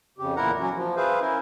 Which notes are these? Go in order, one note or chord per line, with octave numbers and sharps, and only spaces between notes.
F2 C#3 G4
E2 A#2 E4 A#4 F#5 A#5
F#3 C#4 F#4
F3
G#4 B4 C5 E5 F5
C#4 E4 A#4